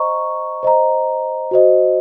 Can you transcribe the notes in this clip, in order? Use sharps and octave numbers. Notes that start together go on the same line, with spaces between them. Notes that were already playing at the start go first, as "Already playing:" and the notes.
Already playing: C5 D#5 A#5 C#6
C5 D#5 A#5
F#4 C5 D#5